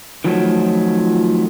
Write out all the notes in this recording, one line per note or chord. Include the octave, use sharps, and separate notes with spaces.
D#3 F3 F#3 A3